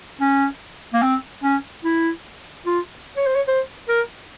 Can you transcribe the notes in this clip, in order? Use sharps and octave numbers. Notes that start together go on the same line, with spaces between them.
C#4
A#3
C4
C#4
E4
F4
C#5
C5
C#5
C5
A#4